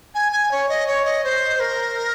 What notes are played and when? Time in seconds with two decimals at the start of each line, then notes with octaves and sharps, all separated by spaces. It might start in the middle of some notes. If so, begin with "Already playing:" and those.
0.15 G#5
0.32 G#5
0.51 C#5
0.69 D#5
0.87 C#5
1.05 D#5
1.24 C5
1.60 A#4